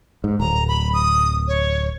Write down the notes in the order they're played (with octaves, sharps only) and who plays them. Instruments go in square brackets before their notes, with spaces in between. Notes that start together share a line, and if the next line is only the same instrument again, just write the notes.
[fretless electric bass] G#2
[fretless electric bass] D1 [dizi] A#5
[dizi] B5
D#6
C#5